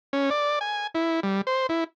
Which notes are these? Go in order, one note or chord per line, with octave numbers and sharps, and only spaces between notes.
C#4
D5
G#5
E4
G3
C5
E4